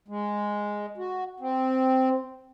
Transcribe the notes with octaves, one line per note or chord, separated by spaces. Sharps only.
G#3
F#4
C4